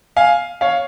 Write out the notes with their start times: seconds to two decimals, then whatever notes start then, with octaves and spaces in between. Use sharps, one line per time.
0.16 F5 G#5
0.61 C#5 F5